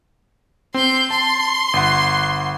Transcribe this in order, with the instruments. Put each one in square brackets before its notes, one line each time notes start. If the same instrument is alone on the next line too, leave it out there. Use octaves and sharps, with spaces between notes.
[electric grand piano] C4 [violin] C6 G6
[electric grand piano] A5 [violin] C6
[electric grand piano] G1 F#5